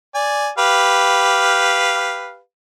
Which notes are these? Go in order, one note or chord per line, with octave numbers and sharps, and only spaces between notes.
D5 G#5
G4 B4 F5